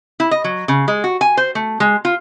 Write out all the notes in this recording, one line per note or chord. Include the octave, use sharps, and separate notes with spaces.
E4
D#5
F#3
C#3
G#3
F#4
G#5
C5
A3
G#3
F4